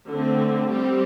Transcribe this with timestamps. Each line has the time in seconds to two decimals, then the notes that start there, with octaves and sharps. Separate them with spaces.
0.08 D3 A3 C4
0.69 G3 C4 G4